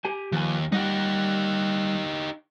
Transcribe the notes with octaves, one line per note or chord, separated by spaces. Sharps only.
G4 G#5
D#2 F3 G#5
G3 D#4 G4 F#5